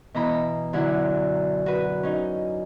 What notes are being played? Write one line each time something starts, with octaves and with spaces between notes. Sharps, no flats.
B2 E3 A#5 B5
F#2 D3 E4 F#5
F#4 B4
C#4 D#4